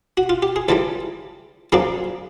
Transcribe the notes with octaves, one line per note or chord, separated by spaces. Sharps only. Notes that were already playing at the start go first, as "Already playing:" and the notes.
F#4
F4
G4
G#4
C#2 C#3 E3 G3 A4
F#2 C#3 F3 A#3 D4 G#4